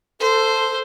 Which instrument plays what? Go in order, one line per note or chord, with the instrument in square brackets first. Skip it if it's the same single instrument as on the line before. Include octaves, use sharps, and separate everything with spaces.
[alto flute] A4 [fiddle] C5